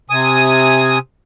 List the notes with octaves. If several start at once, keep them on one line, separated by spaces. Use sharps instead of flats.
C3 G#5 D#6